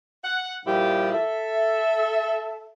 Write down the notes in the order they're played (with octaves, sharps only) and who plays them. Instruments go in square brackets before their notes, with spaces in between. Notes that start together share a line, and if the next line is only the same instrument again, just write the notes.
[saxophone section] F#5
A#2 F3 G3 E4 G4
A4 E5